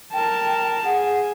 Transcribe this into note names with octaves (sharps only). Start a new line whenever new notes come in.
A#4 G5 A5
G#4 F#5